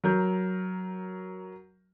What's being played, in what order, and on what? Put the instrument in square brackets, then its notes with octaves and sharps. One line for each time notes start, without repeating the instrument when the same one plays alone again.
[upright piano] F#3 A#4 G6